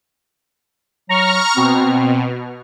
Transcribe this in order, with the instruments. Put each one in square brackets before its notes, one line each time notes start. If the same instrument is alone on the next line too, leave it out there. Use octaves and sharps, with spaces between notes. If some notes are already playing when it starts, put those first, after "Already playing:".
[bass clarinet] F#3 [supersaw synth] A#5 C#6 F6
[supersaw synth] B2 [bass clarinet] C4